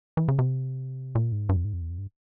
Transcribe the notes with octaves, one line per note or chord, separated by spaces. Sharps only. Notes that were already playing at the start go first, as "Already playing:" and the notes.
E3
C#3
C3
A#2
G#2
G2
F2
G#2
F2
E2
F2
G2